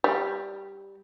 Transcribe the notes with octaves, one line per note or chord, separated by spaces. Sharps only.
G3